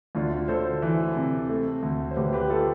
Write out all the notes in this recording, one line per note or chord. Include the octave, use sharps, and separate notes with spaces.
D2 D4 F4
D2 A4 C5
E3
C3
A3
D2
C5
D2 G4 B4
G4 B4
A3 F4 A4